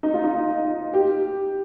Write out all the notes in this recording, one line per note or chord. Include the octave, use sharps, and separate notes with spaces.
D#4
F4
D#4
G4